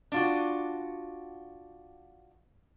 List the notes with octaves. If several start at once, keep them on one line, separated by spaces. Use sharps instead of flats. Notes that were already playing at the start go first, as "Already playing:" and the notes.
D4 F4 F#4